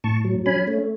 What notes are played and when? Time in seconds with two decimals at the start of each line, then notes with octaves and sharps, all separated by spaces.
0.04 A2 A5 C#6
0.25 F#3
0.46 C#4 G#5 B5
0.67 A3